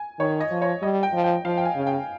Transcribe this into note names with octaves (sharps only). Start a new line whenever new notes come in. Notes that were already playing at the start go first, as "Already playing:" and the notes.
Already playing: G#5
D#3 C#5
D#5
F3
C#5
G3 D#5
G5
F3
G5
F3 F5
G5
G#5
C#3
G5